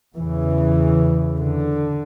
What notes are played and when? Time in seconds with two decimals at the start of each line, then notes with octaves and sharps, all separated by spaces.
0.15 E2 C#3 E3
1.38 D3